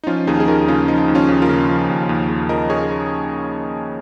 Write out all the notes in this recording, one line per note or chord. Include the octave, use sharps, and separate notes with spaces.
D#4
F3 C#4 F4
D#2 D#4 G#4
G#4
D#2 F4 A#4
C#3 C#4 F4
F3 D#4
D#2
C#4 F4
D#2
F4 A#4
C#3
F3
D#2
D#2
C#3
F3 A#4 D#5
G#4 C#5